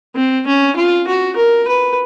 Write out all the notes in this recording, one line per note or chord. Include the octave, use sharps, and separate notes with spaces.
C4
C#4
F4
F#4
A#4
B4